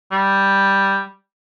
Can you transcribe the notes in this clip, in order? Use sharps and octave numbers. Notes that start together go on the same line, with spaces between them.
G3